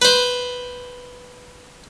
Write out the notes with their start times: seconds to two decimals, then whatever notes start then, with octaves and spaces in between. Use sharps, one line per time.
0.02 B4 C5